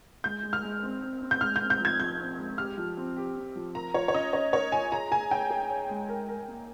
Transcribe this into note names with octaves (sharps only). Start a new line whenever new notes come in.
G#3 G6
G#3
F6
G#3
C4
C4
C4
G6
G#3 F6
C4 G6
G6
F3 G#6
F3 G6
C4
G#3
G4 F6
F3
C4
G4
C4
F3
A#4 A#5
F4 C#5
C#5
C#4 D#5
C#4 C#5
A#4 C#5
F4 G#5
G#4 A#5
G#4 G#5
C#5 G5
G#4
C#5
G#3
A#4
A#4
A#3